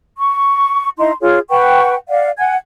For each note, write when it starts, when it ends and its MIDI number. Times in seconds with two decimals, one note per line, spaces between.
0.18 0.88 85
0.98 1.12 63
0.98 1.12 64
0.98 1.12 82
0.98 1.12 84
1.21 1.39 65
1.21 1.39 68
1.21 1.39 73
1.49 1.94 71
1.49 1.94 78
1.49 1.94 79
1.49 1.94 85
2.09 2.30 74
2.09 2.30 77
2.09 2.30 78
2.38 2.55 78
2.38 2.55 80
2.38 2.55 92